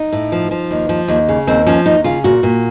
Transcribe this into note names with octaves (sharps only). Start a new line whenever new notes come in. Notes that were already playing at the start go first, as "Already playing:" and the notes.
Already playing: D#4
A2
F3
F3
D#2
F3
D#2
C#3
D#2 C4
F3 C#4
D#2 D#4
C#3 F4
A#2 F#4
A#2